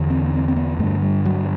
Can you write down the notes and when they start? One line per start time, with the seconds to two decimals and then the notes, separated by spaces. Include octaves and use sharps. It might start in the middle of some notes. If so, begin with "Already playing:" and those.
Already playing: E2 D3
0.10 C4
0.25 B3
0.34 C4
0.48 C4
0.56 B3
0.79 G2 D3 A3
1.02 G3
1.25 F#3